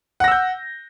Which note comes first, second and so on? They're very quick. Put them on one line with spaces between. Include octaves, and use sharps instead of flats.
F#5 A#6 E6 G6